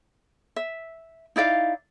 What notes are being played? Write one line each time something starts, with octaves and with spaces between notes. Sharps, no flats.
E5
D#4 E4 D5 F5